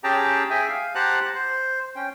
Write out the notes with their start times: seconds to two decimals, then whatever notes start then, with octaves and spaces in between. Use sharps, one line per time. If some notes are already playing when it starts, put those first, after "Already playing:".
0.04 C#4 G4 G#4 G5 A5 A#5
0.50 G#4 E5 G5 G#5
0.69 F5
0.95 G4 C5 F#5 A5 A#5 F#6
1.34 C5
1.96 C#4 G5